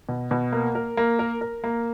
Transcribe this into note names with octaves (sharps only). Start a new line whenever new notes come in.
B2
B2
A#3
A#4
A#3
A#4
A#4
A#3